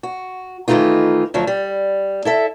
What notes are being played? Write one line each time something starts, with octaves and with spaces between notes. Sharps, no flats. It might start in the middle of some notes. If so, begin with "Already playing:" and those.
F#4
D#3 E3 F#3 A3 D#4 F4
D2 F3 F#3
G3
E4 A4 E5